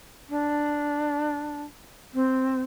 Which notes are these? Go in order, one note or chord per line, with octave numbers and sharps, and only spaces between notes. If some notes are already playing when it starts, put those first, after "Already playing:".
D4
C4